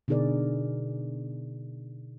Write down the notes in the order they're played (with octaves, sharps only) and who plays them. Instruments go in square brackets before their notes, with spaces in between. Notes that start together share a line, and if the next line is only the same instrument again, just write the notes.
[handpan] B2 D3 D#4 G#4 A#4 D5